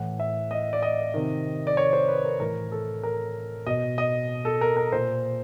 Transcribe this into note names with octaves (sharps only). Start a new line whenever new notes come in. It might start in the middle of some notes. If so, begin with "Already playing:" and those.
Already playing: A2 E3 F#5
E5
D#5
D5
D#5
C3 D#3
D5
C#5
C5
B4
A#4
A2 E3 A#4
A4
A#4
B2 D#5
D#5
A4
A#4
A#4
A#2 C5